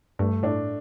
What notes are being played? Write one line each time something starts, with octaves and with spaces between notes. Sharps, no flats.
G2 A3
A2 D4